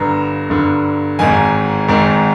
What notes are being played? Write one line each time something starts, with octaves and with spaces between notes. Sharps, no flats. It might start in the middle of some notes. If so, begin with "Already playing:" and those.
Already playing: G1 G2 D3 A#5
G1 G2 D3
G#1 G#2 D#3 G#5
G#1 G#2 D#3